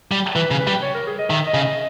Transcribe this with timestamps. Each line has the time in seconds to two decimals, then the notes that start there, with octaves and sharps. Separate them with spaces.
0.12 G3
0.35 E3 B4
0.51 C#3
0.59 B4
0.67 G3
0.82 C#5
0.94 A#4
1.07 G#4
1.19 D#5
1.30 D#3 E5
1.46 D#5
1.54 C#3
1.62 D#5